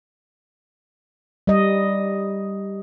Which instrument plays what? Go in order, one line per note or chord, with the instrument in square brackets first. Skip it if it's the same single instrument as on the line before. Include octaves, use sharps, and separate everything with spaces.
[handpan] G3 D#5